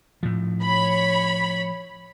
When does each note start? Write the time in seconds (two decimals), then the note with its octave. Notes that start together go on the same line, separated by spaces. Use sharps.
0.23 A2 F3
0.63 C#5 B5